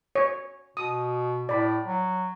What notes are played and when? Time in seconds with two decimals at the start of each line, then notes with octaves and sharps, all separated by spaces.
0.15 C#5
0.77 B2 D#6
1.49 A2 D5 B5
1.84 F#3